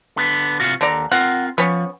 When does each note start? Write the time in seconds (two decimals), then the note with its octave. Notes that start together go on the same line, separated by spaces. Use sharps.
0.17 D3 B3
0.60 C3 F4 F#4
0.81 D#2 D3 D5 A#5
1.12 C4 F4 A#4 F#5
1.58 F3 B3 C#4